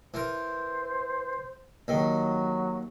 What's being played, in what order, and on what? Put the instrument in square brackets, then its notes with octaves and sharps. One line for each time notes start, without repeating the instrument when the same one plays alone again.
[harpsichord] E3 A#4 [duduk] C5
[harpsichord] D#2 D#3 [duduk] F#3